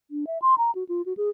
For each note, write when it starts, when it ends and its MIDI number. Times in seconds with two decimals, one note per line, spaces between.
0.11 0.25 62
0.27 0.38 76
0.42 0.54 84
0.58 0.71 82
0.75 0.84 66
0.89 1.02 65
1.06 1.13 66
1.17 1.29 68